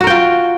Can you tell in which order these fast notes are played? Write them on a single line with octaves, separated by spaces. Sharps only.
F#4 A#4 G5 F4